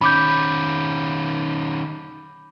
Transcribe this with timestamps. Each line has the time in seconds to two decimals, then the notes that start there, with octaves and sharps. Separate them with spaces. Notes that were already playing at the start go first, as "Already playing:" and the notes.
0.01 D#3 C#4 B5 D6 G6